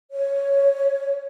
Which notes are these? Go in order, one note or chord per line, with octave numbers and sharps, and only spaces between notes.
C#5